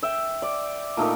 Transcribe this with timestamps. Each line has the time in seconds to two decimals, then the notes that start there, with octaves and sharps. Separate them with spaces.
0.03 E5 G5
0.42 D5
0.97 A#2 A3 D#4 A#4